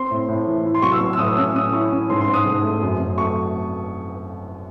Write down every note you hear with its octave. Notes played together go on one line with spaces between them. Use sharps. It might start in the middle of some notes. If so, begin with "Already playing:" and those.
Already playing: C4 C6
A2
A2
E3
E4
C6
F#3 C#6
E6
F#3
E6
A2 D#6
C#4 E6
C#4 D#6
E4 C#6
C#4
G#2 C6
C6
G#2
D#6
G#2
A3
F#2
F#2
A3 C#6